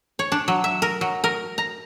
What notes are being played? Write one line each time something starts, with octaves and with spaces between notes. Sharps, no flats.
C#5
D4
F#3
E5
A#4
F#3
A#4
A#5